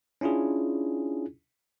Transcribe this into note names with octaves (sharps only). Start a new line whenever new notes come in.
C#4 D4 E4 F4 G#4